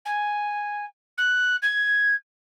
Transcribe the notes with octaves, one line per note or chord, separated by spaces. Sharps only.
G#5
F#6
G#6